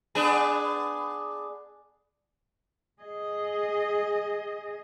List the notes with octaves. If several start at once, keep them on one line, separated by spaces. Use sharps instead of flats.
B3 D4 G#4
G#4 D#5